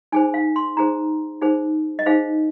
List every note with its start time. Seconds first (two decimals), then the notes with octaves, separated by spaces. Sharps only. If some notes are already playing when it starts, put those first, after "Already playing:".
0.12 D#4 G#4 C5 G#5
0.34 F5
0.56 C6
0.77 D#4 G#4 C5 A#5
1.41 D#4 G#4 C5
1.99 D#5
2.06 D#4 G#4 C5 F5